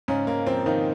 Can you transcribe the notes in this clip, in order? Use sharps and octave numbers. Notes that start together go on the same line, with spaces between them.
G#2 C#3 C#4
G#2 A#3
F3 C4
D#3 F3 D#4